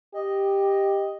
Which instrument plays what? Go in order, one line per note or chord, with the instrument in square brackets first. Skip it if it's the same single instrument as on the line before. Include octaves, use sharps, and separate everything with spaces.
[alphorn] G4 [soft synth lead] D#5